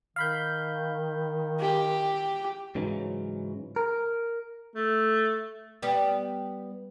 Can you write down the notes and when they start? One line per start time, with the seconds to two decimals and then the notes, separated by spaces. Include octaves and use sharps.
0.16 D#3 F5 B5 G6
1.60 G4
2.75 G#2 C#3 E3 F#3
3.76 A#4
4.75 A3
5.82 G3 B3 G4